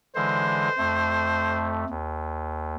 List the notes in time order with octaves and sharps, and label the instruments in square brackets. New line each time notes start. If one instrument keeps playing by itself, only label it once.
[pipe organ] D3 E3 G#3 [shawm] C5
[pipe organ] F2 A3
D#2